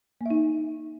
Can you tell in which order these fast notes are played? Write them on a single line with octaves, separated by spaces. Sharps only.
A#3 E5 D#4